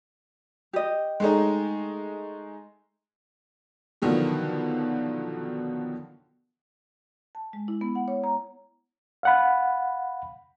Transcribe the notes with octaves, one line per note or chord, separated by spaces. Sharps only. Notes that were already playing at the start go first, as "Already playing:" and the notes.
G4 D#5
G#3 A3 D#4
B2 D3 D#3 F3 F#3 B3
A5
G#3
E4
B3
F#5
C#5
A#5
F5 F#5 B5